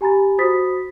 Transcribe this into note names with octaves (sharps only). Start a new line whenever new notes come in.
G4 G#5 A#5 B5 A6
F#4 C5 B5 D#6 A6 B6